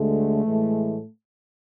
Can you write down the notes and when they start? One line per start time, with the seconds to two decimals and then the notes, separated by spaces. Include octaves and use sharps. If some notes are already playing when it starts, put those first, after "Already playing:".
Already playing: D2 D3 G#3 A3
0.45 A2 E3 G#3